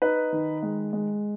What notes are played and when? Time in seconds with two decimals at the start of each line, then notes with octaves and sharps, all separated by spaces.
0.02 D#4 B4
0.32 D#3
0.63 G#3
0.93 G#3